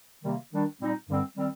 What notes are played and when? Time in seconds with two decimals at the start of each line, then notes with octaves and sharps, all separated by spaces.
0.23 C3 D#3 G3 A#3
0.52 D#3 G3 D4
0.80 A#2 G3 C4 D#4
1.09 G2 D3 G3 C4
1.37 D#3 G3 C4